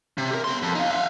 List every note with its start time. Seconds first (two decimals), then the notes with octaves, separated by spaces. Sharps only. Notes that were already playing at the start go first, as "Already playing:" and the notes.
0.18 C3
0.31 G4 A#4
0.44 B3 C6
0.62 F2
0.75 D#4 F5
0.91 E5 F5